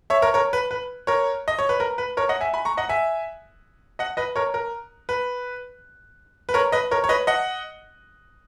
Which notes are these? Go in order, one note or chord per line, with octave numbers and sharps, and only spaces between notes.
C#5 E5
A#4 C#5
A#4 C#5
B4
B4
A#4 C#5
D#5
C#5
B4
A#4
B4
A#4 C#5
D#5 F#5
E5 G#5
G#5 B5
A#5 C#6
D#5 F#5
E5 G#5
D#5 F#5
B4 D#5
A#4 C#5
A#4
B4
B4
A#4 C#5
B4 D#5
A#4 C#5
C#5
B4 D#5
D#5 F#5